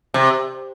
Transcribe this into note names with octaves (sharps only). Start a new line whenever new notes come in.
C3